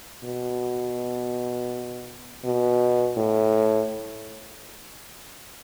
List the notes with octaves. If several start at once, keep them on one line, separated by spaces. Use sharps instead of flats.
B2
B2
A2